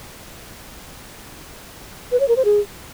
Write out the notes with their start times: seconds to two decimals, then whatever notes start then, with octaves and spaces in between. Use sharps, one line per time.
2.12 B4
2.20 C#5
2.28 A#4
2.36 C5
2.45 G#4